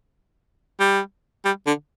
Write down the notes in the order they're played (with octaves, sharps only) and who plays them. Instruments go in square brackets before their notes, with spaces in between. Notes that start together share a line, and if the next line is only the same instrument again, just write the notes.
[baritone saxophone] G3
G3
D3